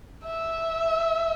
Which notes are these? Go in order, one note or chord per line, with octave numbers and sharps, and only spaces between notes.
E5